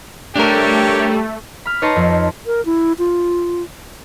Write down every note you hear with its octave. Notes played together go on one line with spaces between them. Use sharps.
G3 A3 D4 G4 A4 A#4 C#5
B5 F6
D#4 B4 C#5 A5 A#5 C6
F2
A#4
E4
F4